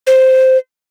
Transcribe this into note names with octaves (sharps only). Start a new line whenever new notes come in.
C5